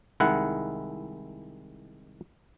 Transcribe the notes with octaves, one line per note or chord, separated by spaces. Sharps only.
C2 D#3 G#3 E4 F#5